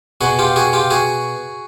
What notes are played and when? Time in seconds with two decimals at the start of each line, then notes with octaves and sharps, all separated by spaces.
0.21 B2 F#4 G#4
0.39 F4 G4
0.56 F#4 G#4
0.73 F4 G4
0.90 F#4 G#4